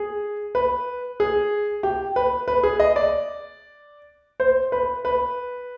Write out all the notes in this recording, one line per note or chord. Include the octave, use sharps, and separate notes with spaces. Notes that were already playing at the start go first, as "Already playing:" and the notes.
Already playing: G#4
B4
G#4
G4
B4
B4
G#4
D#5
D5
C5
B4
B4